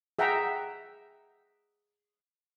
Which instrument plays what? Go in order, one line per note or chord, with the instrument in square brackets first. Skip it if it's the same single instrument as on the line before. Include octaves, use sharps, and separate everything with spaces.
[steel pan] G#4 E5 F#5 G5 A#5